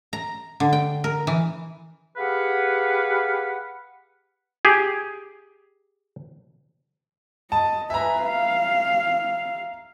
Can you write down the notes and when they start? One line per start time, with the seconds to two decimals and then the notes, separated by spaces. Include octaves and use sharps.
0.13 A#5
0.60 D3
0.73 G5
1.04 A#4
1.27 E3
2.17 G4 G#4 B4 F5 F#5
4.65 G4 G#4
7.52 D#5 A5
7.90 B4 E5 G#5 A#5
8.22 F5